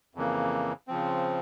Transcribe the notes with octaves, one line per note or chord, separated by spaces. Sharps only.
F2 C#3 E3 A#3
C#3 F3 C4